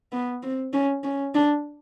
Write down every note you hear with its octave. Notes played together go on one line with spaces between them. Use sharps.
B3
C4
C#4
C#4
D4